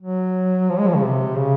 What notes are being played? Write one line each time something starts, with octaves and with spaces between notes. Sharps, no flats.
F#3
F3
G#3
F3
C#3
C3
C#3